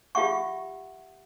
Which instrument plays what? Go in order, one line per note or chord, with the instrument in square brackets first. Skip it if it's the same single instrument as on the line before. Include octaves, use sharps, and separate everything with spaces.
[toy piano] F4 G4 E5 F#5 C#6